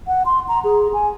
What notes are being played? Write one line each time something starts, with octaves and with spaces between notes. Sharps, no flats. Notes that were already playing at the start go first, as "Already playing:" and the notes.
F#5
C6
A#5
G#4
G#5